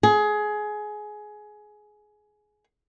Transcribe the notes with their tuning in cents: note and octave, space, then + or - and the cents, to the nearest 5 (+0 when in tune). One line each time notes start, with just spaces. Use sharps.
G#4 +20